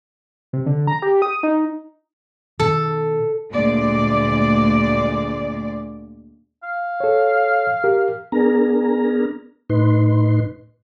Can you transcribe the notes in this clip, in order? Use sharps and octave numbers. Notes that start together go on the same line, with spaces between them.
C3
D3
A#5
G4
D#6
D#4
B2 D#3 A4
D2 A#2 G#3 D5
F5
A4 C#5
G4 A#4
B3 D4 G#4 A#4 A#5
A2 D#4 B4 C6